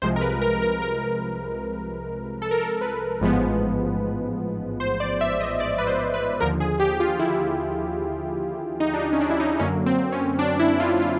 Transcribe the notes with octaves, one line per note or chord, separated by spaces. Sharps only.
C2 C3 F3 G#3 C5
A#4
B4
A#4
A#4
A#4
A4
A#4
A4
B4
A1 G#2 F3 G#3 B3
C5
D5
E5
D#5
D5
B4
C5
B4
D#2 D3 F3 A#4
G#4
G4
F4
E4
D#4
D4
D#4
C#4
D4
E4
D#4
F#2 D3 F#3 A#3 C#4
C4
C#4
D4
E4
F4
F4